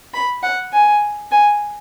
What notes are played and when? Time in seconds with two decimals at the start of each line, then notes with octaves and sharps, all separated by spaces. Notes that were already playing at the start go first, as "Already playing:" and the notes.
0.14 B5
0.43 F#5
0.73 G#5
1.31 G#5